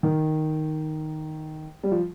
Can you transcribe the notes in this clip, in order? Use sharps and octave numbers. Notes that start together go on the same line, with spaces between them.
D#3
G3
F3